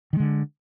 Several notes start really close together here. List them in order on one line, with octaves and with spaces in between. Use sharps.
D#3 G#3 D3